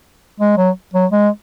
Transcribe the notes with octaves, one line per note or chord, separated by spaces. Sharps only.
G#3
F#3
F#3
G#3